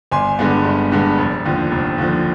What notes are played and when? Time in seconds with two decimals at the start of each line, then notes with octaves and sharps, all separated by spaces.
0.12 G1 G#5 C6
0.39 G2 D3 G#3 B3
0.65 G1
0.92 G2 D3 G#3 B3
1.18 F1
1.45 D#2 D3 F3
1.72 F1
1.98 D#2 D3 F3